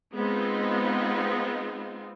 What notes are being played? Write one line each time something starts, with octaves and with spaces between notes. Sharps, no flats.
G#3 B3 C4 D#4 F4